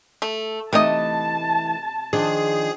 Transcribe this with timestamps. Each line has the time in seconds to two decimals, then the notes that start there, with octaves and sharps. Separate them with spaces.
0.22 A3
0.73 C3 E3 A3 D#4 D#5 A5
2.13 D#3 F3 D4 G#4